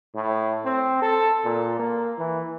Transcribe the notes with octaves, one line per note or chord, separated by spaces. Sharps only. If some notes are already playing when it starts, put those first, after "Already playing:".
A2
C4
A4
A#2
A#3
E3